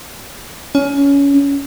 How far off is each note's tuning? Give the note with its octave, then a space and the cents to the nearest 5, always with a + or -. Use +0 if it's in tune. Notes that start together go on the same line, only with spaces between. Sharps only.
C#4 +20